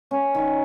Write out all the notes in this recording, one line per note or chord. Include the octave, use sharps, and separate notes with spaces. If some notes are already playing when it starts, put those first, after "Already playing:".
A#3 C#4
D#3